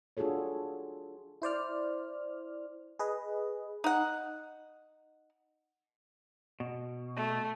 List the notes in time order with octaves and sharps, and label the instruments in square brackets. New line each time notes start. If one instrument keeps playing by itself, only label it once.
[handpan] D4 F4 F#4 G#4 A4 C#5
[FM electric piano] E4 C5 D5 F6
G#4 B4 D#5
[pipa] D#4 F#5
[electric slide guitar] B2
[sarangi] A3